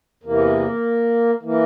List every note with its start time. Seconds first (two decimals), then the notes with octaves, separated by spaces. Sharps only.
0.23 E2 C3 E3 A#3
1.43 E3 A#3